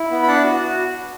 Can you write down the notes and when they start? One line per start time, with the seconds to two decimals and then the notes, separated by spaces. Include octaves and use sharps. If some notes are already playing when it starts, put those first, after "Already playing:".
Already playing: E4
0.11 B3
0.23 B5
0.27 D4 F#5 A5
0.44 F#4
0.61 F#4